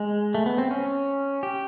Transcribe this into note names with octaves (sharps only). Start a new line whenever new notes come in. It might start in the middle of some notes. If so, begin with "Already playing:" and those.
Already playing: G#3
A3
B3
C4
C#4
G4